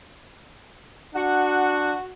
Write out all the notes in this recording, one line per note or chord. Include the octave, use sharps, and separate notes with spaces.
D4 F#4 F#5